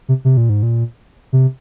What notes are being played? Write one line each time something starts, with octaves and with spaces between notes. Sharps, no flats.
C3
C3
A#2
G#2
A#2
C3